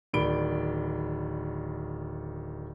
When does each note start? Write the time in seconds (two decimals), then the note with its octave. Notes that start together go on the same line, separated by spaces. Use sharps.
0.13 D1 D#3 D5 B5 D7 G7